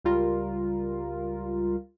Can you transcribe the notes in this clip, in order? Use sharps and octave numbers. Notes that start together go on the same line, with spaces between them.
C#2 G3 F4 A#4